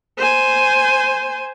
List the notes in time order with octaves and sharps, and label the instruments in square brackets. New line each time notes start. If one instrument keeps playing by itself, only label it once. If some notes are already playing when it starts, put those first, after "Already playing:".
[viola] C5 G#5